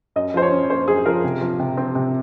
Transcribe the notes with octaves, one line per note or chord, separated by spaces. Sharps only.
F#2 D#5
F3 C5
C#5
C#4
A#3 C5
F#2 G#4
F3 A#4
C3
F3
C3
C4
C3